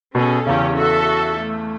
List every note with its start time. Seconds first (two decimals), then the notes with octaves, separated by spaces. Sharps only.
0.15 B2 C#4 G#4 A4
0.47 E2 C#3 C#4 G4
0.77 F#4 A4 E5
1.36 A3